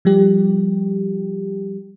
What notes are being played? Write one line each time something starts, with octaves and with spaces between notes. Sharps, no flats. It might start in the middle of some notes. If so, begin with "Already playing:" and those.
F3 G3 G4